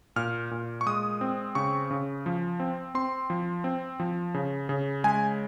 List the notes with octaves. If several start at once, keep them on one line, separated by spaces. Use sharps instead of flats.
A#2 F6
A#2
C#6
G#3 D#6
C4
C#3 C#6
C#3
F3
C4
C4 C6
F3
C4
F3
C#3
C#3
G#3 G#5